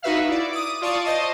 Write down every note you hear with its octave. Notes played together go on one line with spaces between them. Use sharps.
D#4 F#4 B4 E5 F5
E4 D5
D6 D#6
F4 D5 A5 C#6 D#6
C5 D#5 A5